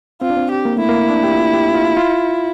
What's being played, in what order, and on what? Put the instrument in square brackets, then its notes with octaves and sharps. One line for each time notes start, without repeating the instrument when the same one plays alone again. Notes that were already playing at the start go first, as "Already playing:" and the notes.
[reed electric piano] C4 [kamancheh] F4
[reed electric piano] D4
C4
[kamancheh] G4
[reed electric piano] A#3
[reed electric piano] A3 [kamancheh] E4
[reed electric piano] A#3
D4
G4
F4
G4
F4
F4